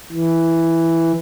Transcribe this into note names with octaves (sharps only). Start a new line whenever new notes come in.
E3